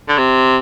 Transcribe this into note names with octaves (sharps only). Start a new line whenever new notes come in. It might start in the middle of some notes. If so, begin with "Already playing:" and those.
D3
C3